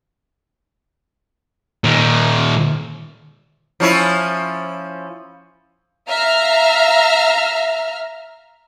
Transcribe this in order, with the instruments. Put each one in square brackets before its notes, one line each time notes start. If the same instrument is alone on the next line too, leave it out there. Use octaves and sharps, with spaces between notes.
[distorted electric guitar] A#2 D#3
[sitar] F3 C#4 E4
[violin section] E5 F5 A#5 F6